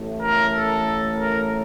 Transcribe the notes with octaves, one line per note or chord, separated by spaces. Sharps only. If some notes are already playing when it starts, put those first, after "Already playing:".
Already playing: A1 A2 A3
A#4
A4
A#4